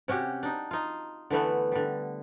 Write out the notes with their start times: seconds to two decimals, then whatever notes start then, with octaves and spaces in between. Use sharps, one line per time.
0.08 C3 C#4 F#4 G4
0.43 D4 D#4
0.71 D#4 F4
1.30 D3 E3 A3 B3
1.72 D3 G3